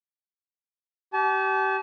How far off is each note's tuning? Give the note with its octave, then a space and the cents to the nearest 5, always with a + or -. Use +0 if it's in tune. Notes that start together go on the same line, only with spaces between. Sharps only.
G4 -30 A5 -40